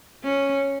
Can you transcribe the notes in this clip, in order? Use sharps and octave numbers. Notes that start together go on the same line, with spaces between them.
C#4